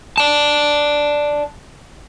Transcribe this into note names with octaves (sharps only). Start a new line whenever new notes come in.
D5 A5